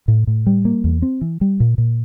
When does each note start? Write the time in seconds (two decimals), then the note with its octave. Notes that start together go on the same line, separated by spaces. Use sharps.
0.08 A2
0.27 A2
0.47 G3
0.65 A#3
0.84 E2
1.02 C4
1.21 E3
1.41 G3
1.60 A#2
1.78 A#2